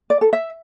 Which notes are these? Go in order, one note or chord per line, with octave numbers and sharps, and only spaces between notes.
D5
A4
E5